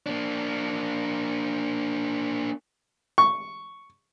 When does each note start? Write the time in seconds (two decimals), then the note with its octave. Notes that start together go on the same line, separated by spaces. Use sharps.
0.06 A#3 D4
3.18 C#6